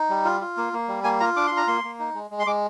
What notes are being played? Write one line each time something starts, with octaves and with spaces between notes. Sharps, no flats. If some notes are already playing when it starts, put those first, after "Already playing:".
Already playing: D#4
G3
F4
F4
A#3
A#3
G3
A#3 G#5
F4 A#5
D4 D6
F4 C6
A#5
A#3 C6
A#3
D#4
G#3
G#3
C6
G#3 D6